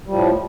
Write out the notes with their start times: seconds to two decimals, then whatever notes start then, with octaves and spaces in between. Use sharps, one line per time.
0.07 G3
0.10 F3
0.13 A2